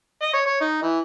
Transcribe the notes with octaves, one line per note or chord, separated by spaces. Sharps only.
D#5
C#5
C#5
D#4
E3